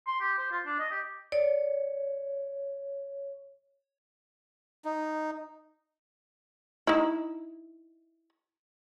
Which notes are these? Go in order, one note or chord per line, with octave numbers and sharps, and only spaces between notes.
C6
G4
C5
F4
D4
D#5
G4
C#5 D5
D#4
D#4 E4